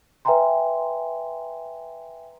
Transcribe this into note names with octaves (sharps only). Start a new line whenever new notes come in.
B4 E5 G5 G#5 A#5 C6